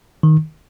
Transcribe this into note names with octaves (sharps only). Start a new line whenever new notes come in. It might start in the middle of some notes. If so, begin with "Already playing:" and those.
D#3